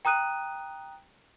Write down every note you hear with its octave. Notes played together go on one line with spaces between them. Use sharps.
G5 A#5 D#6 F#6 D#7